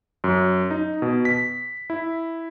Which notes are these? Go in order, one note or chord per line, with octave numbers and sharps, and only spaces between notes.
F#2
D#4
B2
B6
E4